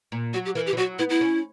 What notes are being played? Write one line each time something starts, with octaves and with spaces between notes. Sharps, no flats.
A#2
F#3 F#4
G4
E3 A#4
G4
E3
F#3 F#4
B3 E4
E4
C#4